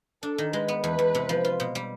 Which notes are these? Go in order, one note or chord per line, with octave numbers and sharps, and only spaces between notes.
D4 A4
D#3
G#3 B4
B3
E2 B4
E2
C3
F3
F4
B2
G3